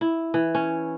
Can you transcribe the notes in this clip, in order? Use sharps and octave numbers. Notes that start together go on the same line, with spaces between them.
E4
E3
C#4